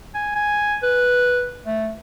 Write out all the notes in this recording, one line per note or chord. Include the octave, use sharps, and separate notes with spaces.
G#5
G#5
B4
A3